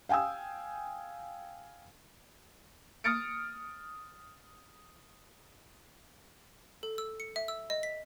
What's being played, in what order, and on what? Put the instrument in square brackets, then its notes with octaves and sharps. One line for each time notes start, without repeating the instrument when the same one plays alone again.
[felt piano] F5 G5 G#5 D#6 E6
[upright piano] D#6 F6 A6 C#7 D7
[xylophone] A4
E6
C#7
E5
E6
D#5
B6